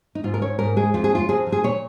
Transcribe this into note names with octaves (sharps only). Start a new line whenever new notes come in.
D#4
G#2 F4
A#4
C#4 C#5
G#2 A#4
G#3 G#4
F2 F4
G#4
C#4 F4
F2 G#4
F3
G#4
A#2 C#5